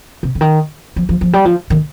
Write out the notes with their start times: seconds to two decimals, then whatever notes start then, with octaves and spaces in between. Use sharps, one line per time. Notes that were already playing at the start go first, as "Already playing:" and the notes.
0.23 C3
0.35 D3
0.41 D#3
0.96 F3
1.09 F3
1.21 F3
1.33 G3
1.45 F3
1.70 D#3